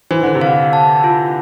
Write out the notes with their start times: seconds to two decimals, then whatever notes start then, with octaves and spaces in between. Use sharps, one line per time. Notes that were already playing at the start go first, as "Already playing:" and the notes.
0.11 E3 C5
0.23 D3
0.35 C3
0.41 F5
0.47 D3
0.73 A5
1.04 F4